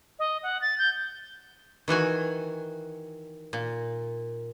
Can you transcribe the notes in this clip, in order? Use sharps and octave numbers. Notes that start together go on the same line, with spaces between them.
D#5
F#5
A6
G6
D#3 E3 F#4 G#5
A#2